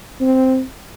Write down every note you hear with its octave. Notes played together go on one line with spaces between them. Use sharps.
C4